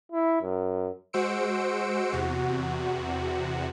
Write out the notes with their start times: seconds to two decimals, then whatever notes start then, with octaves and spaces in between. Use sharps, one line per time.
0.12 E4
0.42 F#2
1.13 G#3 F#4 C5 E6 C#7 D7
2.12 E2 C3 F#4